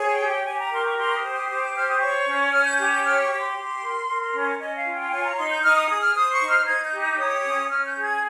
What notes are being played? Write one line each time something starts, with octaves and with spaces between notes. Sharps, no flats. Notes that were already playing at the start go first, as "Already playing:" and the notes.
Already playing: G#4 C#5
G5
G4
G5
G4 G#5
A#5
A#4 C6
C#6
G4 C6
C#6
D#6
C5
D#6
G4 D#6
G6
C5 F6
D#6
C#5 C#6
C#4
C#4 F6
G6
G4 G6
G6
C#5 F6
C#6
G4
C6
G4
A#4
A#4
C#4
C#4 D#5
F5
F4
G5
C#5 G#5
A#5
D#4 C6
G6
D#4 F6
D#6
G#4 D#6
F6
C5 D#6
C#6
D#4
F6
D#4 G#6
G6
G4
G6
C#5 D#6
C#4
C#4 F6
G6
G#4
G#6